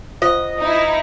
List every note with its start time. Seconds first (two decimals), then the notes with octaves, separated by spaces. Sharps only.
0.22 F4 C5 D#5 F#5
0.59 D#4 E4